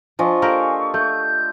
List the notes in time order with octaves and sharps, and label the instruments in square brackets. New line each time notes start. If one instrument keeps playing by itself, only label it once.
[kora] F3 [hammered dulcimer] D4 F4 D#5 [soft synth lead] G#5 [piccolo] C#6
[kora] A#3 G4 A#4 [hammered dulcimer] A4
[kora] A3 [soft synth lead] G6